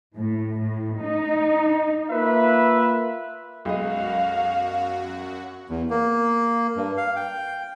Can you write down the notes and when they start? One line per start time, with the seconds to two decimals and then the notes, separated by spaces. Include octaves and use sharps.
0.16 A2
0.58 A2
1.02 D#4
2.10 A#3 F4 B4 E5
3.65 B1 F#2 G#3 F#4 D#5 F5
5.70 E2
5.90 A#3
6.76 G2
6.97 F5
7.16 G5